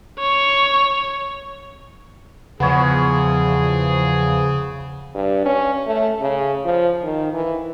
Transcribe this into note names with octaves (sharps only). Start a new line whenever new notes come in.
C#5
E2 C#3 F3 B3 G#4 C#5
G2
C#4
A3
C#3
F3
D#3
E3